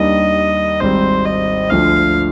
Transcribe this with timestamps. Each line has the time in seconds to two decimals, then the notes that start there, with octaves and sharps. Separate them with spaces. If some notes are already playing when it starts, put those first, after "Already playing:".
Already playing: D#2 D#3 G3 D4 D#5
0.80 G#1 G#2 G3 C4 C5
1.26 D#5
1.70 D2 D3 F3 F5